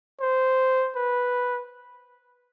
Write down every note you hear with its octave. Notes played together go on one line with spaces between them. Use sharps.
C5
B4